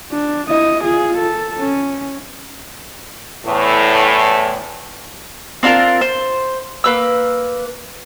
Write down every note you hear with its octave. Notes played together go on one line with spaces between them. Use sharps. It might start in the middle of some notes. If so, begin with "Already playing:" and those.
D4
E4 D#5
F4 G#4
A4
C#4
E2 A2
C4 D4 F4 A#4
C5
A#3 B4 E6